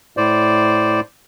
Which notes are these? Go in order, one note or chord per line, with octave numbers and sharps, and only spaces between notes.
A2 C5 D5